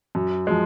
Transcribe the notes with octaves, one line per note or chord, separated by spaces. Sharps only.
F#2
F3 G#3